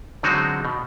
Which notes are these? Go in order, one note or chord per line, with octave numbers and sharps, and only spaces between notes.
D3 F#3 G#3 C4 D#4 F#4
B2